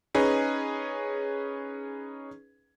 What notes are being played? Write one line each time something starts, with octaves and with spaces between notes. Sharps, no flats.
C#4 D#4 G#4 B4